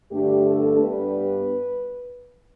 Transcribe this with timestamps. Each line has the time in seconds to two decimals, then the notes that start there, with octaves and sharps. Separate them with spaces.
0.11 G2 D3 A3 D4 G4
0.44 A4
0.77 G2 G3 B3 B4